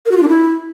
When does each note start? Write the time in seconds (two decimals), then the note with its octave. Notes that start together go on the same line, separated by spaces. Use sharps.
0.06 A#4
0.11 F#4
0.17 F4
0.23 D4
0.28 E4